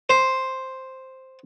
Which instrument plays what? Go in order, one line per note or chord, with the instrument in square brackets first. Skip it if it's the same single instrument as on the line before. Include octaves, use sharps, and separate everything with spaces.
[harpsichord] C5